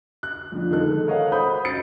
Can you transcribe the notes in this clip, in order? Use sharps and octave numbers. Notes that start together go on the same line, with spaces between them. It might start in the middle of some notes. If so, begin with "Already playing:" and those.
F#6
F2 D3 F3
D#3 G#3 A4 F#6
A4 A#4 C#5 D#5 F5 F#5
C5 B5 D#6 G6
F#1 F#4 A6 C#7